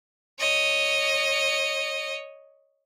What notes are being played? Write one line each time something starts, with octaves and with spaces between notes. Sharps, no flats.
C#5 D#5